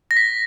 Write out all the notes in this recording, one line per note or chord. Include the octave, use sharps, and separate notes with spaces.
A#6
B6